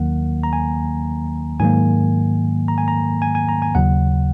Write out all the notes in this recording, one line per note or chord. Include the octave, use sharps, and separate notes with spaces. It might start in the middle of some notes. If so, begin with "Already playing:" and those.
Already playing: D#2 D#3 F#3 A#3 F#5
A#5
G#5
G#2 D#3 F#3 A#3 G#5
A#5
G#5
A#5
G#5
G#5
A#5
G#5
D#2 C#3 F#3 F#5